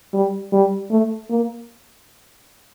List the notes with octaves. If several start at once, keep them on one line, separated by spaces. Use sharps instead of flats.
G3
G3
A3
A#3